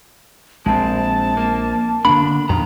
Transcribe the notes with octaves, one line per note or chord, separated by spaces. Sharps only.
A#1 G#3 C4 A5
A#3
D3 A#3 B3 D4 B5
F2 A#2 D#3 F3 A#5